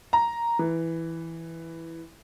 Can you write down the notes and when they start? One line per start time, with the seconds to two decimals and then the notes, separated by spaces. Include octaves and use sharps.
0.13 A#5
0.59 E3